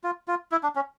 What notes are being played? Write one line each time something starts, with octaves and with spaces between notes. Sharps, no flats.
F4
F4
E4
D4
C#4